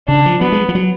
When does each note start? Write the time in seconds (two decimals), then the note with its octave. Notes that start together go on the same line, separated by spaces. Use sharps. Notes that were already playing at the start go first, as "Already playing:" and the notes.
0.08 C#3 D4
0.26 F3
0.41 F#3 B3
0.52 G#3
0.69 F3
0.75 F#3